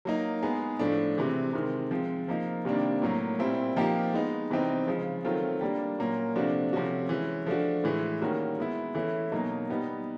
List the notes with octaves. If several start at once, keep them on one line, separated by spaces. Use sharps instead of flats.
F#3 A#3 D#4
G#3 B3 D#4 G#4
A2 F3 A3 D4
C3 E3 G#3
C3 D#3 G#3
F3 G#3 C4
F3 A#3 D#4
C3 D#3 G3 A#3 D4
A2 F#3 A#3
A#2 G3 C4 E4
F3 A#3 D#4 G4
G#3 B3 D#4
C3 E3 G3 C4 D#4
C#3 F3 G#3
D#3 F#3 A3 C4 F4
G3 A#3 D4
A#2 F#3 A#3 C#4
C3 F3 A3 D4 F#4
C3 F3 A3 C#4 F#4
E3 G#3 C#4
F3 A3 D4 F#4
A2 E3 G#3
D#3 G3 A#3 C#4 F#4
G#3 B3 E4
E3 A3 C#4 E4
B2 F#3 A#3 D#4
G3 B3 D#4